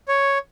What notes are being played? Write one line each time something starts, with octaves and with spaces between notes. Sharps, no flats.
C#5